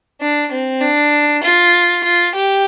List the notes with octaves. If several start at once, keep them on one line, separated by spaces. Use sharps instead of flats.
D4
C4
D4
F4
F4
G4